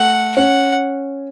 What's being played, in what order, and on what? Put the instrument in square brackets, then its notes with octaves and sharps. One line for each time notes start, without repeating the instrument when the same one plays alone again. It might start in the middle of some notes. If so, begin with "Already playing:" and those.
Already playing: [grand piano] A3 [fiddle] F#5
[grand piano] C#4 [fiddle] F#5